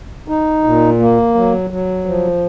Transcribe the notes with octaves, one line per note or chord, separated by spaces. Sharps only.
D#4
A#2
A#3
F#3
F#3
F3